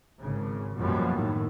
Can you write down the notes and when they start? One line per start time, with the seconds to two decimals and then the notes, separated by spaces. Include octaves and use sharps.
0.20 G#1 C#3
0.76 F#2 B2 F3 G3 A#3 B3
1.13 A2 D#3